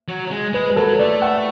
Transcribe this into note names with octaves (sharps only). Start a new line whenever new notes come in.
F#3
G#3
G#3 B4
B4
F#3 A4
A3 D5
F#5